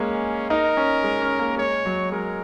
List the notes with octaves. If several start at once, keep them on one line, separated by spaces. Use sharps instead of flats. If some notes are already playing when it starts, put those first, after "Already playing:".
Already playing: G#3 A#3 C#4
D#4 A#4
C#4
G#3
C#4
A#3
G#3 C#5
F#3
G#3 A#4